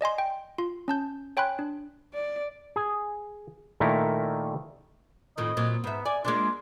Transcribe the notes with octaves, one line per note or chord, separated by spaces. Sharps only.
D5 D#5 G#5 C6
G5
F4 C6
C#4 A5 G6
C#5 G5 G#5 B5 C6 F#6
D4
D5
G#4
A#2 D#3 A3 E4 A#4
F2 A2 D#3 D#5
A#2 F#3
G#2 B3 E5
D5 G#5
G#3 A#3 D4 F4